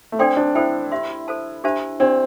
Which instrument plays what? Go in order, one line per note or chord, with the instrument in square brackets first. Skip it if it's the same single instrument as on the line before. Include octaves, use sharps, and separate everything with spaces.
[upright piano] A3
[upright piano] C4 [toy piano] D4 A4 D5 G5 C6
[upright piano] D4
[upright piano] E4 [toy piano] A4 C5 G5
[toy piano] G4 E5 C6
A4 C5 A5
D4 G4 C5 E5 A5
[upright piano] C4 [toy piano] D4 G4 D5